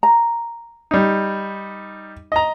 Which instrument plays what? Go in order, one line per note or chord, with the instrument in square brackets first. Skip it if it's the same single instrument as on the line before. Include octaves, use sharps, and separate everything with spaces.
[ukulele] A#5
[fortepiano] G3 D#4
D#5 A#5